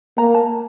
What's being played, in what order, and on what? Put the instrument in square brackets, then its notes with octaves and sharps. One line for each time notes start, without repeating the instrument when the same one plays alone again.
[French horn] A#3 [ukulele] A#5
[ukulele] A5